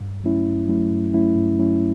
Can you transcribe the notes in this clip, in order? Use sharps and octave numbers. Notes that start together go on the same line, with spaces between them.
G2
F#3 A3 C#4 E4
G2
F#3 A3 C#4 E4
G2
F#3 A3 C#4 E4
G2
F#3 A3 C#4 E4